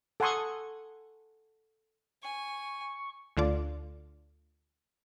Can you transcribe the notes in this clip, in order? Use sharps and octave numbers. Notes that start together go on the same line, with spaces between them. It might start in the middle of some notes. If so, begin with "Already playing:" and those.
A4 F#5 G#5 C6 C#6 D#6
G#5 C#6
D2 D3 F4 D5